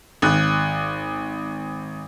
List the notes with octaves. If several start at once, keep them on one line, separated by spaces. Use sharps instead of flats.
G#1 F#6